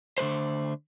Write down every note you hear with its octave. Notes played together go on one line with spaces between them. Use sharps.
D3 A3 B4 C5